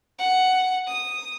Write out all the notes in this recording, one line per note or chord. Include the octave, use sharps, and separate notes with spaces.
F#5
D#6